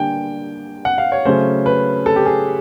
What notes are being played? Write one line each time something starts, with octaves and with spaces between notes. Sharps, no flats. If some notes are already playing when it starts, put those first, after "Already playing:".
Already playing: D3 G3 A#3 D4 G5 G#5
F#5
F5
C#5
C#3 F#3 A3 C#4 C5
B4
A4
G4
G#4